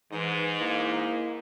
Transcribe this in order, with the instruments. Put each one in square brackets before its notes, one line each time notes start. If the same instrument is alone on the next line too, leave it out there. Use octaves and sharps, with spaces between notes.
[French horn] G#2 [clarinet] E3 [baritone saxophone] D#4
[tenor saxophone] A#3 [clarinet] E4